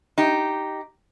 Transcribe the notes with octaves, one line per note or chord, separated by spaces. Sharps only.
D#4 G4